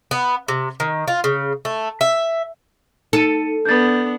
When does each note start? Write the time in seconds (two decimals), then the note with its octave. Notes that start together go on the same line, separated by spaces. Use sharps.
0.11 B3
0.48 C3
0.80 D#3
1.08 F4
1.24 C#3
1.65 A3
2.01 E5
3.13 D#4 A4 C#7 D#7
3.65 B3 D4 G6 A6